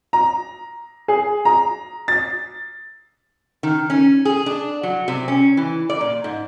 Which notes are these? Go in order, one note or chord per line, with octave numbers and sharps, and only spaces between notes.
A#5
G#4
A#5
A6
D#3
C#4
G#4
D4
F#3
C3
C#4
E3
D5
A#2
G#2